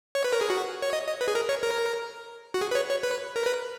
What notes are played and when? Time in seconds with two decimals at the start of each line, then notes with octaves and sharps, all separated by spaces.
0.15 C#5
0.24 B4
0.33 A#4
0.41 G#4
0.50 F#4
0.82 C#5
0.93 D#5
1.07 D#5
1.21 B4
1.28 G#4
1.35 A#4
1.49 C#5
1.63 A#4
2.54 F#4
2.61 G#4
2.71 B4
2.75 C#5
2.90 C#5
3.03 B4
3.36 A#4
3.46 B4